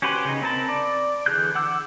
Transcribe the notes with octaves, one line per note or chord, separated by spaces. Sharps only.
C#4 F#4 G4 B4 C5
C#3 D#4
C4 A#4 A5 B5
D5
D3 E3 G#4 F#6 G6
F#5 D6 E6